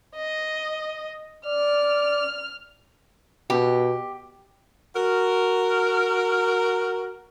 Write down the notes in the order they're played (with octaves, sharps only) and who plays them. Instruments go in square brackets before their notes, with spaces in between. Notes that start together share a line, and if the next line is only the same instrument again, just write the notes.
[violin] D#5
[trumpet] D5 [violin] F6
[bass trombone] B2 [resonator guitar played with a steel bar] G4
[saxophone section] F#4 A#4